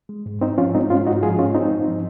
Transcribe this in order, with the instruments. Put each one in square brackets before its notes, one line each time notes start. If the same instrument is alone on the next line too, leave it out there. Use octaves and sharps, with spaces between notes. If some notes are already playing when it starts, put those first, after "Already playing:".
[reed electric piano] G#3
G#2
G#2 C4 D#4
F3 C#4 F4
G#3 C4 D#4
G#2 C#4 F4
G#2 D#4 F#4
F3 F4 G#4
G#3 C#4 F4
G#2 C4 D#4
G#2
F3